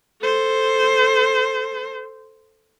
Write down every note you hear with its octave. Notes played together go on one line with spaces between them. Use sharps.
A4 C5